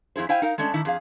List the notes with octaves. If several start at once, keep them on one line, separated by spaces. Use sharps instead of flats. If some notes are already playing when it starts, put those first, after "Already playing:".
F2 E4 G#4 C5
E4 C5 F5 G5 G#5
D#4 A#4 F5
G#3 A3 C#4 D4
A2 D#3 E4
F2 G#4 F5